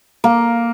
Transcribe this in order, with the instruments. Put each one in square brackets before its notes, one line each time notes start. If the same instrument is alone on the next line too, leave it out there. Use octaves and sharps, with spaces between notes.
[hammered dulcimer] A#3